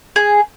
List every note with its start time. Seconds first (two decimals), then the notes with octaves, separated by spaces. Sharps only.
0.16 G#4